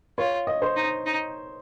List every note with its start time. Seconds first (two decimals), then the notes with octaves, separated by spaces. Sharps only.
0.18 F4 C#5
0.47 D#5
0.62 C5
0.76 D#4
1.06 D#4